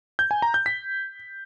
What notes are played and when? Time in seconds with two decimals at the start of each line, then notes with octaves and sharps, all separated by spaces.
0.19 G6
0.31 G#5
0.42 A#5
0.54 G6
0.66 B6